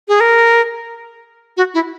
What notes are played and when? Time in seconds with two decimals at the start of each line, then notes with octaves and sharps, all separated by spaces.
0.08 G#4
0.20 A#4
1.57 F#4
1.74 E4